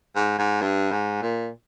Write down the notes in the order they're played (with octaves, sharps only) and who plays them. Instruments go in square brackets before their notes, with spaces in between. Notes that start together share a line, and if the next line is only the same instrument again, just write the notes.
[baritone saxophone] G#2
G#2
G2
G#2
A#2